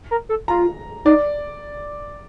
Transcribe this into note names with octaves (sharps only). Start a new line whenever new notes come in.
A#4
A4
F4 A#5
D#4 D5